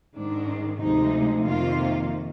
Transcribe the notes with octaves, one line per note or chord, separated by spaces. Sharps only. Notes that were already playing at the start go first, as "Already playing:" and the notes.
G#2 D#3 G#3 D4
D2 C3 F3 G#3 D#4
F2 C3 D#3 A#3 F4